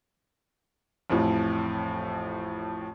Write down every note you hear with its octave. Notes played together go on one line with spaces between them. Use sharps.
A1 F2 A2